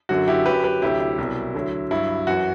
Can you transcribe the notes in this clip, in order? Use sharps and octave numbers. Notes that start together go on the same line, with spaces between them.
F#2 D3 F#3 F#4
E4 G4
F#2 F#3 G4 B4
G4 B4
D2 C3 F#3 E4 G4
E4
C2 B2 F#3
D2 D3 F#3
G2 F#3 E4
F#2 E3 F#4